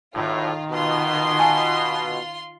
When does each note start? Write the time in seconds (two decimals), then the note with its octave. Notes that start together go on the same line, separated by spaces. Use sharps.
0.15 B1 A2 D#3 F4
0.71 B2 F4 C6
1.39 G#5 A5